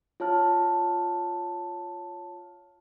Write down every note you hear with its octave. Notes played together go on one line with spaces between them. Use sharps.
F4 C#5 A5 F6